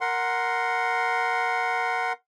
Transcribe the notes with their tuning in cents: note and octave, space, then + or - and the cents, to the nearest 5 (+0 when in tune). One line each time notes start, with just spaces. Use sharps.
A#4 +0 F#5 +0 C6 +0